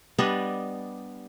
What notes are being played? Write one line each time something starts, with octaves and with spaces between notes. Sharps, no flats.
G3 B3 D4 D#5